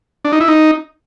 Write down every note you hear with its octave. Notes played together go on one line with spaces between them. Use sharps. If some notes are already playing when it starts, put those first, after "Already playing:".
D4
D#4
E4
D#4